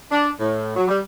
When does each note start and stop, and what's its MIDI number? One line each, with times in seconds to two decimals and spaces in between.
0.11 0.30 62
0.40 0.75 45
0.76 0.87 54
0.88 1.00 55